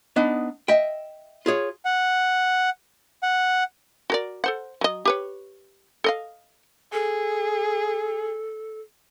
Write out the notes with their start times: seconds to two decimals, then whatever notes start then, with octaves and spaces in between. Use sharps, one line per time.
0.16 B3 D4 D#4
0.68 D#5 E5 G5
1.46 F4 G#4 C#5
1.85 F#5
3.23 F#5
4.10 F#4 A#4 D5
4.44 A4 C5 F#5
4.81 F#3 D#5
5.05 G4 B4 C#5
6.04 A4 D#5 F5
6.93 G#4 A4